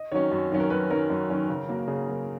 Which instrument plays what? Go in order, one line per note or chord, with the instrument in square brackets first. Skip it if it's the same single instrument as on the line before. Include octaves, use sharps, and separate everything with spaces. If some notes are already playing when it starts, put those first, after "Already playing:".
Already playing: [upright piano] D#5
D#3 F#3 C#4 C#5
F#2
D#3 F#3 C#4
A#4
F#2 B4
D#3 F#3 C#4 A#4
F#2
D#3 F#3 C#4
C#3
F#3 A#3
C#3 G#4
F#3 A#3